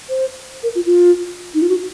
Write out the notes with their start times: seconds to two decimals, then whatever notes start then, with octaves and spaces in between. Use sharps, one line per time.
0.09 C5
0.63 A#4
0.75 F4
0.86 F4
1.54 D#4
1.62 F4
1.69 F#4